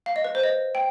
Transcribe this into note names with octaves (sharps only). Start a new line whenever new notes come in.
F5
D#5
B4
C5
D#5
G5